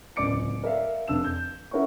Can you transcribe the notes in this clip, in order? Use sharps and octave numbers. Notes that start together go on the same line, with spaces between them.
D1 C#2 D5 D6 C#7 D7
A#4 D5 E5 F5
F1 D4 E6 E7
G6
C#4 E4 A#4 C#5 F#5 C#6